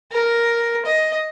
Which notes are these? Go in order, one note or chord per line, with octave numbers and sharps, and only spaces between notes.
A#4
D#5